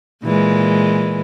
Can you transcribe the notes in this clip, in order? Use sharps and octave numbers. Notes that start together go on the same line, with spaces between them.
A#2 E3 G#3